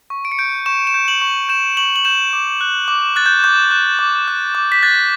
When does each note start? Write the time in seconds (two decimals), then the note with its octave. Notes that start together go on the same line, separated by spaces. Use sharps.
0.10 C#6
0.25 D7
0.32 C#7
0.39 G6 D7
0.66 C#6 E7
0.87 E7
0.94 G6
1.08 F#7
1.22 C#6
1.49 G6 E7
1.77 C#6 F#7
1.96 F#7
2.05 G6 E7
2.33 D6
2.61 F#6
2.88 D6
3.16 F#6 A6
3.26 G6
3.44 D6 G6
3.71 F#6
3.99 D6
4.28 F#6
4.55 D6
4.72 B6
4.82 F#6 A6